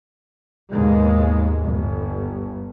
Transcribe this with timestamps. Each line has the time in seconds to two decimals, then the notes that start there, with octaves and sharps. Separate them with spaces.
0.71 D#2 G#2 B2 G#3
1.63 G1